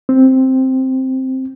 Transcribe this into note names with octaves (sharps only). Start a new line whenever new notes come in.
C4